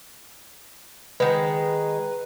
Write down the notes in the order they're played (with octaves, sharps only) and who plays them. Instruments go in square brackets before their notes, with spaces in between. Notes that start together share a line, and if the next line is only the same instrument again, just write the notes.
[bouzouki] D#3 G#3 [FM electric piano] B4